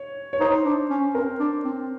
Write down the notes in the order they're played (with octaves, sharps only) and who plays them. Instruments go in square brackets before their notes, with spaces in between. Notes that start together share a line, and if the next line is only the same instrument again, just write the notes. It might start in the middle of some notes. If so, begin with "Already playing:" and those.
Already playing: [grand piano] C#5
C#5
[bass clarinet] D#4 [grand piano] C5
[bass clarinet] D4
C#4
[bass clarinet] C4 [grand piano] A#4
[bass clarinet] D4
C4